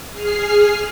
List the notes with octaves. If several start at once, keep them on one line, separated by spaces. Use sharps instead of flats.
G#4 F6 C7